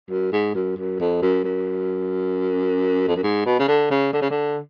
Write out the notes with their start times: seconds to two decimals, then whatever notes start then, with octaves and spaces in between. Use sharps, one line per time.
0.10 F#2
0.32 G#2
0.55 F#2
0.77 F#2
1.00 F2
1.22 F#2
1.44 F#2
3.08 F2
3.16 F#2
3.23 G#2
3.46 B2
3.59 C#3
3.68 D3
3.90 C#3
4.13 D3
4.22 C#3
4.30 D3